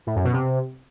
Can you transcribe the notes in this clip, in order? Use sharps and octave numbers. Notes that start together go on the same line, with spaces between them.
A2
F#2
B2
C3